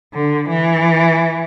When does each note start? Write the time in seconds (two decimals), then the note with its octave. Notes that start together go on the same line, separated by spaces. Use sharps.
0.15 D3
0.49 E3